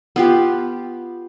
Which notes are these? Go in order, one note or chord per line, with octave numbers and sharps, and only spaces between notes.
B3 F4 G4